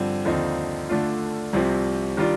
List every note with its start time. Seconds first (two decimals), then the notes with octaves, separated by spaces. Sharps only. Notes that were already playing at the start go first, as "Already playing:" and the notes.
Already playing: G2 D3 F3 C4
0.25 D#2 D3 F3 C4 D#4
0.89 D3 A3 D4 F4
1.53 C2 C3 F3 C4
2.17 D#3 G3 D4 F4